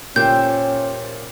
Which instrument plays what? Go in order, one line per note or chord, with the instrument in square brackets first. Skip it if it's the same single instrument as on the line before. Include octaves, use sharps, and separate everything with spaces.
[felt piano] A#2 A#3 [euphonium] C#4 [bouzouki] G4 C5 E5 [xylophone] G6